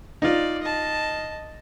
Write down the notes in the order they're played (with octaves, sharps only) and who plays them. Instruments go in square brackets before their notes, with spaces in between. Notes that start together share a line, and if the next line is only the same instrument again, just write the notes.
[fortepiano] D#4 F4 [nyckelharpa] D5
[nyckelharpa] D#5 A5